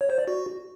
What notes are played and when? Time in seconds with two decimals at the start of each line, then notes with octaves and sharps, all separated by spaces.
0.01 C#5
0.10 C5
0.19 D5
0.28 F#4